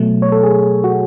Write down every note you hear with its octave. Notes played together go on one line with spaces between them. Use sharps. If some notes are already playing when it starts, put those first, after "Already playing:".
Already playing: B2 F#3 A3
C#5
A4
G#4
F#4